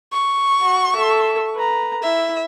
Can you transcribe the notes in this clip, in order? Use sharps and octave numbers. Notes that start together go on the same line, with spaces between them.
C#6
F#4
A4 E5
B4 A#5
E4 E5